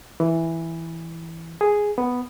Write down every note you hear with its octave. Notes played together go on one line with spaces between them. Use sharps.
E3
G#4
B3